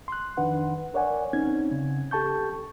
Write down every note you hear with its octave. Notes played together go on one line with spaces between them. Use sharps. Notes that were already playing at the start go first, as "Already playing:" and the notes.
C6 F#6
F2 D#3 D4 B4 F#5
A#4 C#5 D5 F#5 G#5
C2 C4 C#4 D#4 G#6
C#3
G4 A4 A5 C#6 G6